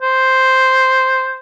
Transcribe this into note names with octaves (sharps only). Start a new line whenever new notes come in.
C5